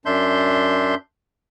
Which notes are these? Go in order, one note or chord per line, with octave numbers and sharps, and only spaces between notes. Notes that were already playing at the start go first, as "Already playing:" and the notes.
F#2 D4 E5 C6 G6